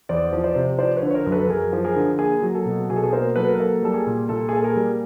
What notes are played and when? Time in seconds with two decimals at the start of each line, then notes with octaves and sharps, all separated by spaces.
0.09 E2 C5 D5
0.33 F3
0.44 C5 D5
0.55 C3
0.79 F3 C5 D5
0.97 B4 C#5
1.02 D3
1.11 C#5
1.14 A#4 C5
1.27 F#2
1.32 A4 B4
1.49 F#2 G#4 A#4
1.73 F3
1.84 G#4 A#4
1.96 D3
2.19 A#3 G#4
2.43 F#3
2.55 A4
2.65 B2
2.90 B2 G#4
2.96 A4
3.04 G#4
3.13 A#3 A#4 C5
3.36 F#3 A4 B4
3.48 A#4
3.60 A#3 A4
3.82 G3 A4
3.94 G#4
4.07 A#2
4.29 A#2 A4
4.49 G#4
4.53 A#3 A4
4.64 G#4 A#4
4.76 G3